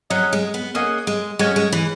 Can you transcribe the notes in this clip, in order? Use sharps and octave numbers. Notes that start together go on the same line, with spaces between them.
F#3 C#4 G#4 D#5 F#5
G#3
B3
A#3 C#4 G#4 D#5 F#5
G#3
G#3 C#4 F#4 C#5 G#5
G#3
E3